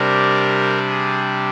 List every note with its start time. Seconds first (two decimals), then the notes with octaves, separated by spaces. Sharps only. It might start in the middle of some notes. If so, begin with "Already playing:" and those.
Already playing: C3 G3 D4 A#4
0.89 G#4